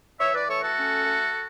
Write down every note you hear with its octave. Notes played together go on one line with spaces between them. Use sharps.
E3 C#5 E5
B4 D5
A3 A4 C#5
F#4 A4
C#4
A3